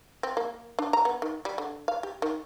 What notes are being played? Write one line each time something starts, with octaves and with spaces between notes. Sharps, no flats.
C4
A#3
D4
A#5
B3
D#3
G3
D3
F5
G4
D#3